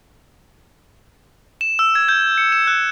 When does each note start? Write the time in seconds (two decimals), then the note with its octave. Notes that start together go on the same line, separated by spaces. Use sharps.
1.61 E7
1.79 E6
1.95 G#6
2.09 G6
2.38 C#7
2.52 E7
2.67 F#6